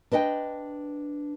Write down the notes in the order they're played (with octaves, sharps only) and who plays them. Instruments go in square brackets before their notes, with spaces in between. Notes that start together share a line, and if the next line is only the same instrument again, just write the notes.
[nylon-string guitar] D4 B4 D#5 F#5 G5